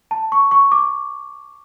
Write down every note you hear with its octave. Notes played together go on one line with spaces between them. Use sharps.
A5
C#6
C#6
D6